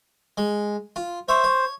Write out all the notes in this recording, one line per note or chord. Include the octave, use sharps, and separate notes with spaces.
G#3
F4
C5 C#5 E5
C#5